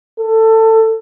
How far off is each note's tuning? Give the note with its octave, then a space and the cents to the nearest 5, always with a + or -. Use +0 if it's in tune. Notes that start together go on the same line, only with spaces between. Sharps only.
A4 +20